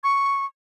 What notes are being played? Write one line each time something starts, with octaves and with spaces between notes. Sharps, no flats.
C#6